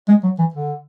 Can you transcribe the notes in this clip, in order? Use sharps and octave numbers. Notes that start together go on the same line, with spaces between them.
G#3
F#3
E3
D3